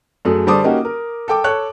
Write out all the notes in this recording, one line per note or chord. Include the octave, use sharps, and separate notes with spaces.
F#2 A3 G#4
D3 G3 C5 A5 D6 D#6
A#3 C#4 D#4 F#4 G4
A#4
A4 G5 D6
A4 C#5 C#6 F#6